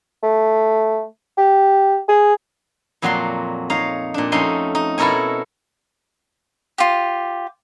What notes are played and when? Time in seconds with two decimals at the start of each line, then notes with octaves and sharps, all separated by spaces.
0.23 A3
1.38 G4
2.08 G#4
3.02 F2 A#2 F#3 F#4 D5 C6
3.70 D#4 C#5 F5 A#5
4.14 A#2 D4
4.32 F2 A3 C#4 D#4 D#5 C6
4.75 D#4
4.98 B2 E4 A4 A#4 C#5 G#5
6.78 F4 G4